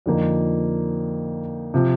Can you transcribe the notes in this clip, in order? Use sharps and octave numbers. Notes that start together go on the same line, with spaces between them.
F2 D3 F3 A#3 D#4
C3 F3